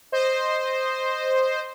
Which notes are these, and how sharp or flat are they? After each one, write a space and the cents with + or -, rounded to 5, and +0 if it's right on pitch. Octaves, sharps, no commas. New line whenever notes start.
C5 +0 D#5 -10